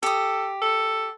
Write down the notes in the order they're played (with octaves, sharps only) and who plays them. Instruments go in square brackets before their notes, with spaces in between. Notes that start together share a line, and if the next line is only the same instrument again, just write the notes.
[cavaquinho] G4 D#6 [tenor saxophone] A4
[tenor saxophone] A4